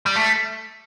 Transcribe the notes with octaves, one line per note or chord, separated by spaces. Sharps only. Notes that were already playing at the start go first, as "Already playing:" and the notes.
G3
A3